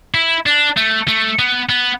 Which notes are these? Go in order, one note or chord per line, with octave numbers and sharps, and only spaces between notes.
E4
D4
A3
A3
B3
B3